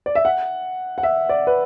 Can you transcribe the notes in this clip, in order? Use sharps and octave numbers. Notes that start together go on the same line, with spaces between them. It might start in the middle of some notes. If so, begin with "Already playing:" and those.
D5
E5
F#5
F#5
E5
D5
B4